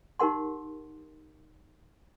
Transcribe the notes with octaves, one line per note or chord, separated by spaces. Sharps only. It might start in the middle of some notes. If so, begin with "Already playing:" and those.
D#4 G4 A#4 F#5 C6